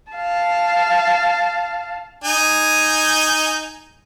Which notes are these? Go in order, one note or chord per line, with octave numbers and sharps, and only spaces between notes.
F5 A5
D#4 G#5